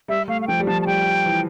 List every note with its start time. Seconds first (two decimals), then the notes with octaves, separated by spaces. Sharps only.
0.08 G3 E5
0.28 A3 F5
0.42 F5
0.47 F3 G5
0.60 G3
0.67 F3 A5
0.82 A5
0.87 G3 G5
1.26 E3